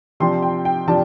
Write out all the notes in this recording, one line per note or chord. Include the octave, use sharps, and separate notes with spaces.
C3 F3 D4 G5 C6
G5
G5
C3 F3 D4 A5